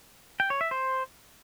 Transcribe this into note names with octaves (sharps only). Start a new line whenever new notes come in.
G5
C#5
E5
C5